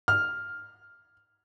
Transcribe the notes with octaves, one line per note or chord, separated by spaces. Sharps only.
F6